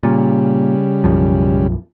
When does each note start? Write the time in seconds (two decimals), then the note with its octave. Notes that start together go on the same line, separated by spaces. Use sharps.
0.03 A#2 C#3 G3
1.04 B1 F#2 F3